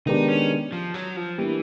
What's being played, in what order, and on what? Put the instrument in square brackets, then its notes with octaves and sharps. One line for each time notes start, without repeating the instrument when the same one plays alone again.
[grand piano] D#3 G#3 B3 D4 G4 [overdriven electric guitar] D#4
[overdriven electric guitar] C#4
F3
F#3
F3
[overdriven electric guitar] E3 [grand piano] G3 A#3 D4